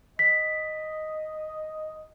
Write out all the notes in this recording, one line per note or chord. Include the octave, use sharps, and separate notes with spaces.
D#5 B6